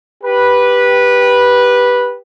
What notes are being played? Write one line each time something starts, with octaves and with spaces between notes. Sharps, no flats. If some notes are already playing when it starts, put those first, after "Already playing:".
G4 B4